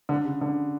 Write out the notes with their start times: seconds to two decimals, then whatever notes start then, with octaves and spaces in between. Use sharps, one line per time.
0.09 D3
0.25 C#3
0.41 D3